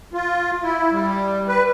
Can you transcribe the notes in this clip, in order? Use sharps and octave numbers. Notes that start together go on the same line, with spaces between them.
F4
E4
G3
B4